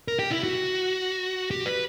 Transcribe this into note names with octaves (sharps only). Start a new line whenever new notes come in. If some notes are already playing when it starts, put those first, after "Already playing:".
A#4
G4
E4
F#4
G4
B4